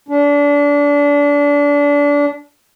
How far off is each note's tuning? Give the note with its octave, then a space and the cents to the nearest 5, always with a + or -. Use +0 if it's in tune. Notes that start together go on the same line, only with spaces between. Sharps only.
D4 -25